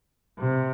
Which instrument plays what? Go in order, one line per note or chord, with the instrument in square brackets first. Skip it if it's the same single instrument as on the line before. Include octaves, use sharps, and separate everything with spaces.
[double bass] C3